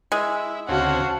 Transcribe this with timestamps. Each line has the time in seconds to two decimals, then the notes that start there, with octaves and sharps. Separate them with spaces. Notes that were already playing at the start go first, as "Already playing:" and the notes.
0.12 G#3 E4
0.69 D2 C#3 C4 F#4 F5 A5